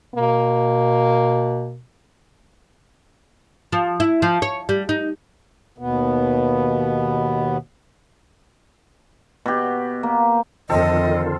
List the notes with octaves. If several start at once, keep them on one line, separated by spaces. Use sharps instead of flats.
B2 A#3
F3
E4
F3
C#5
G3
D#4
D#2 B2 B3
B2 G4
A#3
F2 D3 D#3 C4 F4 A4 D#5